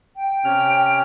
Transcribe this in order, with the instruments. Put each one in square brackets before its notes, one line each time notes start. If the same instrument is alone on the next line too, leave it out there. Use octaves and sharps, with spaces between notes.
[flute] G5
[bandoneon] C3 C#4 F6